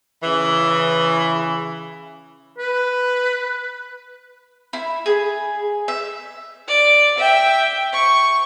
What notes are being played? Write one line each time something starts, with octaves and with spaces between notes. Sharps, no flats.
C#3 E3
B4
E4
G#4
E5
D5
E5 G5
C#6